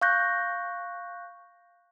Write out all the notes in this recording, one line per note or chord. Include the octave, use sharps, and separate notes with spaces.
F5 C#6 F#6 G6 A#6